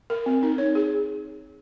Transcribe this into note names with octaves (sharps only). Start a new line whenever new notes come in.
A#4
C4
D#4
C#5
G#4